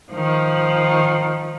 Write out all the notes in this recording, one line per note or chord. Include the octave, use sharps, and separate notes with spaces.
D#3 F3